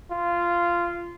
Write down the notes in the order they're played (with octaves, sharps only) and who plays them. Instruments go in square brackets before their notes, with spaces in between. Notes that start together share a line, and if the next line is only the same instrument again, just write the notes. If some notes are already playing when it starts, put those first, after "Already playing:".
[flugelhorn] F4